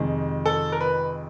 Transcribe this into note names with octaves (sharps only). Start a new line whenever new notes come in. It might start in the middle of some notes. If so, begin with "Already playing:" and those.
Already playing: F2 C3 D#3 G#3
A4
A#4
B4